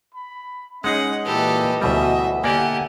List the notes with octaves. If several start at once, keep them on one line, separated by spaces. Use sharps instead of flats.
B5
G#3 C#4 D#4 G#4 D#5 F#5
A#2 E3 G4 A4 B4
D2 B2 E3 F#3 G3 E5
D3 A#3 G4 D5 E5 F#5 G#5